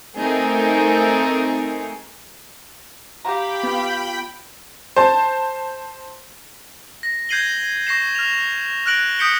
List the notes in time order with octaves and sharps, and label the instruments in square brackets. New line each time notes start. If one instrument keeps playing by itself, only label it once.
[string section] A3 C4 D#4 G#4 A#4
[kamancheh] G4 F5 [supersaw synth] G5 B5 [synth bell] A#5
[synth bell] B3 F4
[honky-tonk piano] C5 A5
[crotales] A#6
G6 G#6 C7 D#7 F#7 G7
C#6 A#6 C7 E7
F6 F7
F6 F#6 A#6 D7 F#7
D#6 G6 B6 C#7 D7 G7